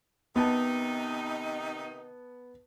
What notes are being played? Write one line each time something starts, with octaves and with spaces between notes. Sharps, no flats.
C3 D#3 B3 D#4 A5